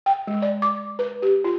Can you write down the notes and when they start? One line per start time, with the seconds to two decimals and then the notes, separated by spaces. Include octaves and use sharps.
0.06 G5
0.27 G#3
0.42 D5
0.62 D6
0.99 B4
1.22 G4
1.44 F4